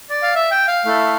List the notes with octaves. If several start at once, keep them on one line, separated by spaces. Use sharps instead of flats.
D5
F5
E5
G5
F5
A3 E4 A4